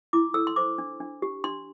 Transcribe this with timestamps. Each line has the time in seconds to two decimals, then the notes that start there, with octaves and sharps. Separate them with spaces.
0.13 E4 D6
0.34 A4 E6
0.47 C6
0.56 C5 D6
0.78 D4
1.00 D4
1.22 G4
1.44 D4 C6